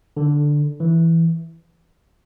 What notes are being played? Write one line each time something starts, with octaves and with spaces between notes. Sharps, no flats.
D3
E3